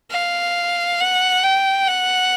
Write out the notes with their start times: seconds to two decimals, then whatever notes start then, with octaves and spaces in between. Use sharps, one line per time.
0.11 F5
1.00 F#5
1.43 G5
1.88 F#5